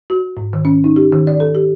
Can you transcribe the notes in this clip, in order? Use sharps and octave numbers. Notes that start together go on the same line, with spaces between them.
F#4
G#2
D#3
C#4
D#4
G4
D#3
D5
A4
G4